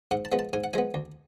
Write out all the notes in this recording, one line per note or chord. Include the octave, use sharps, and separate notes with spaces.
G#2 F#5
A5
F3 G#3 B3
A5
G#2 G#5
F#5
F3 G#3 B3 G#5
D2